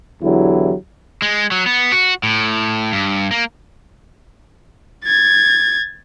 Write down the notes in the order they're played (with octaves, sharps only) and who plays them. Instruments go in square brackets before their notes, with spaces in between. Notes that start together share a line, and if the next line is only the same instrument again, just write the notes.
[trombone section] E2 D3 F#3 E4 G4
[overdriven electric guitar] G#3
F#3
B3
F#4
A2
G2
A#3
[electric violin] G#6 A6